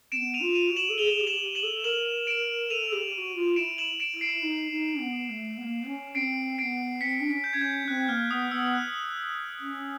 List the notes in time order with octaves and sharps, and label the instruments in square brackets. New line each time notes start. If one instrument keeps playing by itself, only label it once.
[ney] C4 [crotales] D7 E7
[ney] B3
[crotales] D#7 F7
[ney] F4
[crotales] D#7 F7
[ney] F#4
[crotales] E7 F#7
[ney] A4
[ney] G#4 [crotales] F7 G7
[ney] G#4
G4
[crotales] E7 F#7
[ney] G4
[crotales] E7 F#7
[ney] A4
[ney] A#4 [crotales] E7 F#7
[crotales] D7 E7
[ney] A4 [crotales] D#7 F7
[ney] G4
G4
F#4
F4
[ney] E4 [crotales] D7 E7
[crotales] E7 F#7
D7 E7
[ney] E4
[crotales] C7 D7
[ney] D#4
D#4
B3
A3
B3
A#3
C#4
[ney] C4 [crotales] C7 D7
[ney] B3 C4 [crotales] C7 D7
[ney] C4 [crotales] B6 C#7
[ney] D4
C#4
[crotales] G6
G#6
[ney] C#4 [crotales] G6
[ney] C4 [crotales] F#6
[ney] A#3 [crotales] F6
[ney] B3 [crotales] D#6
[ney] B3 [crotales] E6
[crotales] F#6
[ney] C#4